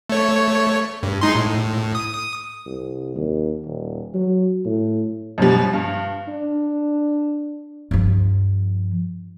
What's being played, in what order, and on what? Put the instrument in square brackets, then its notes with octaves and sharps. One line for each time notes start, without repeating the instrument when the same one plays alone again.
[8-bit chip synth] A3 C#5
G2
G#3 D#4 C6
A2
D#6
[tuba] C2
D#2
D#1
F#3
A2
[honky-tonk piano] F#2 B2 F3 G3
G2
[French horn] D4
[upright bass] G2 F3